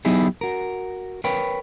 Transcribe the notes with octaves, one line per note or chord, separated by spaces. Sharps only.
F#3 B3 D#4 E4 G4 G#4
F#4 A#4
A#4 B4 C#5 G5 B5